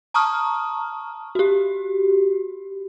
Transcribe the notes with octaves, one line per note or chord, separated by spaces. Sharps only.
A5 A#5 C#6 D#6 F6
F#4 G4